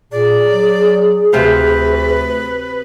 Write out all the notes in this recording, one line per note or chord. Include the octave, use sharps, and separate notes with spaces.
A#2 G#4 D5
F#3
D2 C3 B4 C5 F5